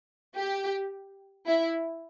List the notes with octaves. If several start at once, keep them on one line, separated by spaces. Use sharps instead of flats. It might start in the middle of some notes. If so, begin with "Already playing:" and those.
G4
E4